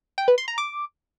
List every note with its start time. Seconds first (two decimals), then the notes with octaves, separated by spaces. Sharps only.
0.18 G5
0.28 B4
0.38 C6
0.48 A#5
0.58 D6